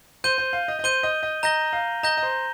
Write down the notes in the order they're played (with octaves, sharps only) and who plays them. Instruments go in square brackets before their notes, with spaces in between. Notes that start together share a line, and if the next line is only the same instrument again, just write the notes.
[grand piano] C5 [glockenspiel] G6 D#7 G7
[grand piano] C5
F5
D#5
D#5
[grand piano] C5 [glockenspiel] G6 D#7 G7
[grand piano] D#5
D#5
[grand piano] D#5 [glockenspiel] A#5 G6 A#6 G7
[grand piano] F5
[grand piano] D#5 [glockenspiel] A#5 G6 A#6 G7
[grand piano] D#5
C5